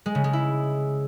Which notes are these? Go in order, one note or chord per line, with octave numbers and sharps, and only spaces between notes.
G#3
C#3
G#3
E4